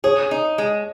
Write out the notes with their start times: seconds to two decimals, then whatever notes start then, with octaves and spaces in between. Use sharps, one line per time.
0.04 G#4 C#5
0.31 D#4
0.58 G#3